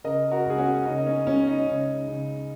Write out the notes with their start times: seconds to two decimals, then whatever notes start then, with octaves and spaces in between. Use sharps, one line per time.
0.04 C#3 A#4 D#5
0.31 F#4 A#4
0.46 C#2 G#4
0.58 C#4 F#4
0.85 C#3 D#4
0.98 D#4
1.07 C#4
1.26 C#2 C#4
1.47 D#4
1.67 C#3
2.07 C#3